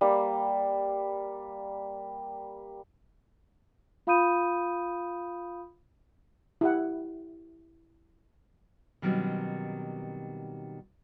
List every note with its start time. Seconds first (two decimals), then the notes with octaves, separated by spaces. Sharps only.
0.01 G3 A#3
4.07 F4 F5 B5 D#6 G6 D#7
6.61 E4 G4 F#5
9.02 B2 D#3 F#3 G3 C4 C#4